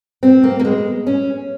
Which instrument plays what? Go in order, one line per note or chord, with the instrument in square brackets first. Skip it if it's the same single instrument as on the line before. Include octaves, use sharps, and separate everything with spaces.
[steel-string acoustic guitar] C4
A#3
A#3
G#3
C#4